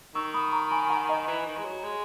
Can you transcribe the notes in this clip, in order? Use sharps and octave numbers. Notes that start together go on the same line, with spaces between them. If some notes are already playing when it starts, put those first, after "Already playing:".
D#3 C#6 E6
B5 D#6
A#5 C#6
G#5 B5
F#5 A#5
D#5 F#5
E3
D#3
G#3
F#3
G#3